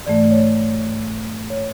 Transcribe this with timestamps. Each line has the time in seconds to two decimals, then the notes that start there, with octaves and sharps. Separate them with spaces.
0.06 G#2 E3 A3 D5
0.31 C#5
1.50 C#5